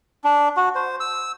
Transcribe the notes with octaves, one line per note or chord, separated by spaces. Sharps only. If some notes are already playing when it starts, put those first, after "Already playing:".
D4
F#4
C5
E6